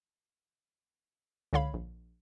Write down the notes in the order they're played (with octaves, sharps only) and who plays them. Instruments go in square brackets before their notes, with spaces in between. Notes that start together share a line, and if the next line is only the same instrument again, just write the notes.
[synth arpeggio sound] C#2 D3 C#5 F5 B5
A#1